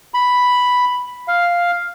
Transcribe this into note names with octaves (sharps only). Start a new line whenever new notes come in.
B5
F5